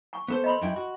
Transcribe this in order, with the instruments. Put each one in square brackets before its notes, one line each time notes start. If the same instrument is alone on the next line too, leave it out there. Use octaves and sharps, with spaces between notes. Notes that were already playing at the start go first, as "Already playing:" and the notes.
[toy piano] G#5 C#6
[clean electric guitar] B3 A4 C5
[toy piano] D#5 B5 C6
[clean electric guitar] F#2 E4 G5
F#4